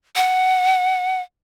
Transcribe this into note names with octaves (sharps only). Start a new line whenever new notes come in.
F#5